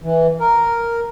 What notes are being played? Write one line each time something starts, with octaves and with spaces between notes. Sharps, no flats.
E3
A#4